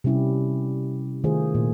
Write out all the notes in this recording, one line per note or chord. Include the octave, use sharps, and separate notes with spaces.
C3 G3 C#4 E4 G4
D#3 A3 F4 G#4 C5
A#2